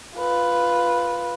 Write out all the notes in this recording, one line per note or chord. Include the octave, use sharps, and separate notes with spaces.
F4 B4